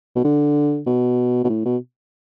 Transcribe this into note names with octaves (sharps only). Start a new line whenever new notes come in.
B2
D3
B2
B2
A2
B2